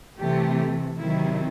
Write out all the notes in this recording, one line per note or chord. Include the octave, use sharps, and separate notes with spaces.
C3 E3 A3 G4
C3 D#3 F#3 E4